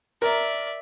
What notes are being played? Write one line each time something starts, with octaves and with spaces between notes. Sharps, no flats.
A#4 D5 E5